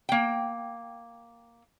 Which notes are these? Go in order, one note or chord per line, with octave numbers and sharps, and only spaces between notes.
A#3 G5